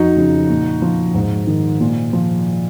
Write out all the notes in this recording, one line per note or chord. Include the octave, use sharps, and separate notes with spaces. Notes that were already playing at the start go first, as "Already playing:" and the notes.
Already playing: F2 D#4 F#4
C#3 F3
A#2
F3
G#2
D#3
A#2
F3